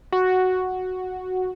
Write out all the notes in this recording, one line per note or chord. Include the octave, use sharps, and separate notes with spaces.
F#4